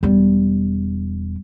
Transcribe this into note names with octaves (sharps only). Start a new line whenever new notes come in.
E1 G3